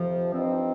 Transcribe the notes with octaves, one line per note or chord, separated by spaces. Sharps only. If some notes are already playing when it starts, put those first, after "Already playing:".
Already playing: F2 C3 F3
G2 F3 C4 D#4